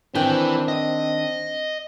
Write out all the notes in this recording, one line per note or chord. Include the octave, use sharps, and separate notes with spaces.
D#3 E3 C4 D4 G5
D#5